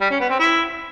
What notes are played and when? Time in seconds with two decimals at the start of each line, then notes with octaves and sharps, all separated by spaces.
0.01 G3
0.10 C#4
0.20 B3
0.29 C4
0.39 E4